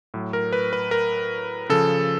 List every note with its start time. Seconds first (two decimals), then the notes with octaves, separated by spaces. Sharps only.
0.14 A2 F#3
0.33 A#4
0.53 B4
0.73 B4
0.91 A#4
1.69 C#3 F3 A4